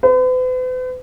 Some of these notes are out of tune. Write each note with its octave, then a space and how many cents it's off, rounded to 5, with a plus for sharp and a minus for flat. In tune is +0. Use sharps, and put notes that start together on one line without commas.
B4 +45